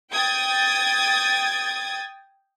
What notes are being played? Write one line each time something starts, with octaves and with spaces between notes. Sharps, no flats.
G5 D#6 G#6 A6